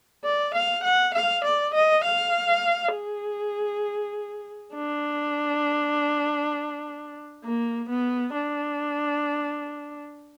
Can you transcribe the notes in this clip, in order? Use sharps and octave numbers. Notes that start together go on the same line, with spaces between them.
D5
F5
F#5
F5
D5
D#5
F5
G#4
D4
A#3
B3
D4